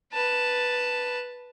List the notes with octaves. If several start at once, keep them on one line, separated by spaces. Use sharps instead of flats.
B4 A5